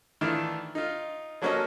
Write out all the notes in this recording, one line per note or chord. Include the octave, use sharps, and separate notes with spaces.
D#3 E3 A3 D4 E4 F4
D#4 F4
F3 F#3 A#3 C#4 A4 D#5